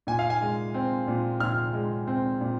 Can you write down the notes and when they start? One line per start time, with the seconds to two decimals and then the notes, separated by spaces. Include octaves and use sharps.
0.07 A#2 G#5
0.19 F5
0.30 G#5
0.41 G#3
0.74 C4
1.08 A#2
1.40 A#2 F6
1.74 G#3
2.07 C4
2.41 A#2